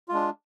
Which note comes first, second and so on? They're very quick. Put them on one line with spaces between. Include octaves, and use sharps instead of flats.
F4 G#3 D4